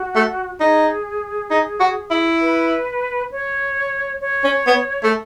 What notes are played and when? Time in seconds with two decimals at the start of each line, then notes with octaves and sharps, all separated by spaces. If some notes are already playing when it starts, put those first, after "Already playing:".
Already playing: F#4
0.16 A3
0.61 D#4 G#4
1.51 D#4
1.80 F#4
2.11 E4
2.41 B4
3.32 C#5
4.21 C#5
4.44 C#4
4.67 B3
5.03 A3